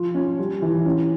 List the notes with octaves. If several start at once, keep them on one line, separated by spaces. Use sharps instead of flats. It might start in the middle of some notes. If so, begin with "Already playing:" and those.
Already playing: F3 F4
C#4
G3
E3
C#4